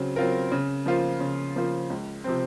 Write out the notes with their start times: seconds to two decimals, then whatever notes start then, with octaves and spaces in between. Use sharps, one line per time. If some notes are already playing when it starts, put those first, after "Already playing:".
Already playing: C#3 F#3 C4
0.16 F#3 C4 F4 A#4
0.52 C#3
0.86 F3 A#3 F4 C5
1.20 C#3
1.56 F3 A#3 F4 C5
1.90 C#2
2.24 C3 F3 C4